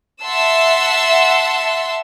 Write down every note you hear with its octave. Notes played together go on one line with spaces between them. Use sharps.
E5 F#5 A5 C6 E6